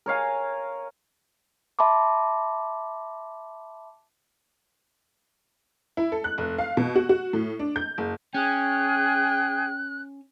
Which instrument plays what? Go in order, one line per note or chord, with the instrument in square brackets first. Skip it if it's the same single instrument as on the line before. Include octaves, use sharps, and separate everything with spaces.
[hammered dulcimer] A#4 C#5 F5 G#5
[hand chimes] E5 A5 B5 C6 D6
[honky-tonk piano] E4
A4
F#6
F1
F5
B2
F#4
F#4
A2
D4
G6
F#1
[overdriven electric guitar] C#4 [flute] G#4 [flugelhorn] G5 [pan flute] F#6